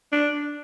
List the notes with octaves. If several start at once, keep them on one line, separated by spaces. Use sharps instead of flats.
D4